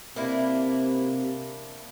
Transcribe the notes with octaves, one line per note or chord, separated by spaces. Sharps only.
C3 A#3 D4 E4